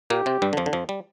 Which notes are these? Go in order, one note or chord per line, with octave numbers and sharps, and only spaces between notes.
A#2 A#3 G4
C3 C4
G2 G3
D3
F2 F3
D3
F2 F3
G3